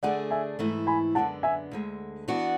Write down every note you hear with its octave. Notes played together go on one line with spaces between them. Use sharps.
D2 D3 A3 D4 G#4 D5 F#5
E5 G#5
G#2 E3 A3 E4
G#5 B5
F#2 D3 G#3 B3 D4 F#5 A5
E5 G#5
D2 D3 G#3
E3 B3 D4 F#4